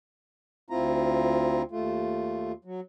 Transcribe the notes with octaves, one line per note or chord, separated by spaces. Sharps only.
D2 C4 E4 F4 A#5
D#2 A3 F4
F#3